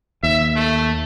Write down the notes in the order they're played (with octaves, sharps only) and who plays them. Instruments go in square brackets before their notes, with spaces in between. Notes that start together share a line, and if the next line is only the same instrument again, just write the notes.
[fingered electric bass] D#2 [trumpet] E5
[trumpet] A3